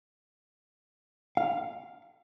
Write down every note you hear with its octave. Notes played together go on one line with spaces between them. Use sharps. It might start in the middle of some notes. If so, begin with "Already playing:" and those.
F5